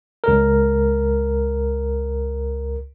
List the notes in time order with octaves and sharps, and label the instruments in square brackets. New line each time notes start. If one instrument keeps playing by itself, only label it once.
[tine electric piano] C#2 A#4